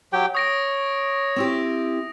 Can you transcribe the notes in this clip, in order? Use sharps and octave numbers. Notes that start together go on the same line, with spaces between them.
F#3 G4 G5
C#5 D#6 A#6 D7
C4 E4 G4